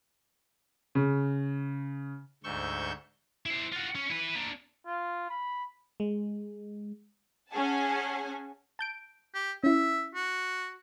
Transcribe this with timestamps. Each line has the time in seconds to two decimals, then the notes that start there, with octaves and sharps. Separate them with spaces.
0.95 C#3
2.44 D2 G#2 C#6 E6 G6
3.46 E4 C5
3.72 F4 F#4
3.95 C#4
4.10 E4 B4
4.35 A#3 D4
4.86 F4
5.29 B5
6.00 G#3
7.51 C#4 G#4 F#5 G#5 A5
8.79 A5 G6 D7
9.34 G4
9.64 C#4 E4 E5
10.15 F#4